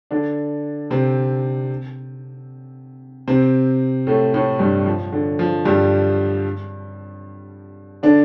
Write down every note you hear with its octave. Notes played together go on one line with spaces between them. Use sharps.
D3 D4
C3 C4
C3 C4
A2 A3
A2 A3
G2 G3
F3
D3
F3
G2 G3
D3 D4